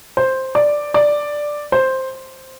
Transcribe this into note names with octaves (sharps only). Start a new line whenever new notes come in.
C5
D5
D5
C5